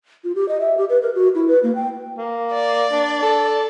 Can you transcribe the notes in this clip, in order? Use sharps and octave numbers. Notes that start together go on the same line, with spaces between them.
F4
G4
D#5
E5
G4
B4
A#4
F#4
E4
B4
A#3
G5
A#3
D5
D4
A4